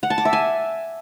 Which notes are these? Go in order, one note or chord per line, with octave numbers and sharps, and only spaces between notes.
F#5
A5
D6
E5
G#5